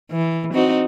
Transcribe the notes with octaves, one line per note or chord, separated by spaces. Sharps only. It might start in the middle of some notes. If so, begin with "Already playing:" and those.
E3
C4 D#4 F#4